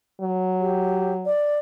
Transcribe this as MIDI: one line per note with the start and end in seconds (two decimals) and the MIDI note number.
0.21 1.30 54
0.60 1.14 67
1.25 1.59 74